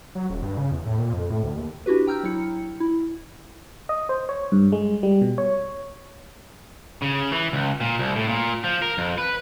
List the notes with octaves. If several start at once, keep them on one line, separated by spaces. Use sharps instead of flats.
F#3
D#1
G2
C#3
E2
A2
A#2
F2
A2
D2
D#2
D4 E4 F#4 G4 B4
G5 A#5 E6 F6 G6
F#3 E4 C#7
E4
D#5
C5
C#5
G2
G#3
G3
B2
C#5
C#3
E3
C#2
A#2
C2
A2
A#2
F3
A#4
F2
B4